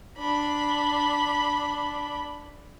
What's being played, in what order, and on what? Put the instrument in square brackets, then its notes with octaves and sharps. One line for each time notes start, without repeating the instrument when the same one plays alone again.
[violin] D4 B5